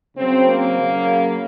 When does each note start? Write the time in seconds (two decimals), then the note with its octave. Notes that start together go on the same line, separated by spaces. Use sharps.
0.16 C#3 F#3 C4
0.47 A#3
0.78 C#3 F#3